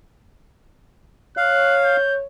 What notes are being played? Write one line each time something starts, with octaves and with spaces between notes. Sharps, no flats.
C#5 F5 F#6
G6